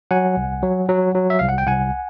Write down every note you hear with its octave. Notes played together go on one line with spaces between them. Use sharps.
F#3 F#5 G#5
C2
F#3
F#3
F#3
E5
C2 F5
F#5
G5
C2 F#5 G#5